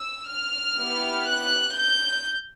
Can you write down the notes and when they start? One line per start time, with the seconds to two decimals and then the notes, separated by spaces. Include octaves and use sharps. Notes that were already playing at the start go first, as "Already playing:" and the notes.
Already playing: E6
0.29 F6
0.78 B3 E4 G4
1.28 F#6
1.76 G6